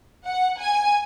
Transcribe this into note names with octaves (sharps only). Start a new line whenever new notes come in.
F#5
G#5